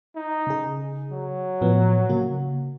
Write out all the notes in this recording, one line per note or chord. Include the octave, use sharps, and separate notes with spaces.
D#4
C#3 G#4
F#3
A2 F3 B3
C#3 A#3 F#4